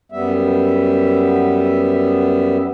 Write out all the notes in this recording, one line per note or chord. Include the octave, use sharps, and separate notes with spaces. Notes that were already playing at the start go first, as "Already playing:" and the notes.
F#2 G3 B3 E5